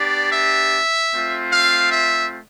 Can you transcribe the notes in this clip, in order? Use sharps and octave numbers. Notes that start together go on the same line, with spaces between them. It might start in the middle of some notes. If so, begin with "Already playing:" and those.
Already playing: B3 D4 G4 D5
E5
A3 C4 F4
F5
E5